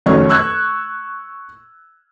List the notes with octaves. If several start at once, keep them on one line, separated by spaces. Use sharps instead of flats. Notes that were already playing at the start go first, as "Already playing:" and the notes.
F1 F#2 D#3 F#3 C#5 C#6
C#6 E6 F#6 G#6